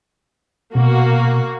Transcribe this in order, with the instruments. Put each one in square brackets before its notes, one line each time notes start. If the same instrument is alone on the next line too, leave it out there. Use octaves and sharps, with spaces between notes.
[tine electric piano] B2 [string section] A#3 F#4